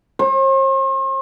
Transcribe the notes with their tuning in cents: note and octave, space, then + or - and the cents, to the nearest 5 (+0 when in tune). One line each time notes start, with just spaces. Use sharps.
C5 +45